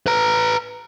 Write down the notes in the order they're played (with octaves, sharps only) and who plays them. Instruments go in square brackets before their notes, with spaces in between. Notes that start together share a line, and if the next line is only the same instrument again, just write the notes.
[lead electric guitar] B4 A#5